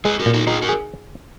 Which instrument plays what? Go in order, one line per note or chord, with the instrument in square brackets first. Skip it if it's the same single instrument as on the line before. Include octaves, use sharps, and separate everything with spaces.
[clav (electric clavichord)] G#3 [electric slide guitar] G#4 B4
[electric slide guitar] F#4 A#4
[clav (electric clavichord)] A#2
[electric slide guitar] D#4 F#4
[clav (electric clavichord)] D#4 [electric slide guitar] F4 G#4
[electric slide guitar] F#4 A#4
[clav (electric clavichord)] G#4